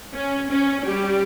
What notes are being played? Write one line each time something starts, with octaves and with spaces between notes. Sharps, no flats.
C#4
C#4
G3 G4